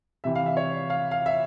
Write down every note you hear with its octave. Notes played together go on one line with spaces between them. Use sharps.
C3 E3 E5
F5
E5
C#5
F5
F5
E5